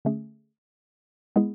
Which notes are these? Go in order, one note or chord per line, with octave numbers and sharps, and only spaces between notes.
D3 A3 C#4 G#4
G#3 B3 E4 G#4